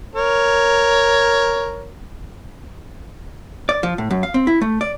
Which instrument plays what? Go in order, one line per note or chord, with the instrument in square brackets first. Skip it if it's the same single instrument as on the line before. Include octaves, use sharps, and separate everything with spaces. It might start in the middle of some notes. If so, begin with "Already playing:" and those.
[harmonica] A#4 C#5
[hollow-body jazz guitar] D5
F3
A2
F#2
F5
C4
E4
A3
D5